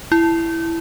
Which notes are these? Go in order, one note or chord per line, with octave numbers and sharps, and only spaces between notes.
E4